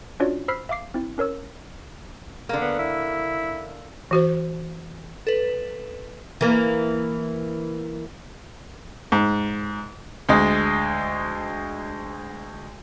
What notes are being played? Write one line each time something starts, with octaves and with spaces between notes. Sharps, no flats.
C#4 D4 F4 F#4 C#5 D5
C5 B5 E6 F6 B6 C7
E5 F5 D6 C7
C4 E4
C#4 A#4 C#5 E6
D3 A#3
B3
E4
E3 F#4 C5
A4 B4
E3 A#3
G#2
D2 G#3 D#5